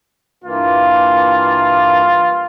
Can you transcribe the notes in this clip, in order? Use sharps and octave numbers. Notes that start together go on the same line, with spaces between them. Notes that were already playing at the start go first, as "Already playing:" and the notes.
G2 E3 A#3 F4